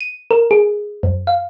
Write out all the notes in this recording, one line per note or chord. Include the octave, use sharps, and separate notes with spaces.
D#7
A#4
G#4
F#2
F5